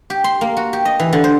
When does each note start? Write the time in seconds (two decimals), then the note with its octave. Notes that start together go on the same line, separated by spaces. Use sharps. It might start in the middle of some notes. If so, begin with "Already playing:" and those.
0.10 G4
0.24 C6
0.41 A#3
0.57 F#4
0.73 G4
0.85 D#5
1.00 E3
1.13 D3
1.24 C5